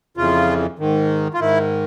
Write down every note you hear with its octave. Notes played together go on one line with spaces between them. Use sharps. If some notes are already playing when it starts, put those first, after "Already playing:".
F2 C#3 E3 F4
G#2 D#3
F4
G#2 D#3 E4